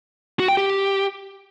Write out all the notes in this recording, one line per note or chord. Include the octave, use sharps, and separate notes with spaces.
F#4
G5
G4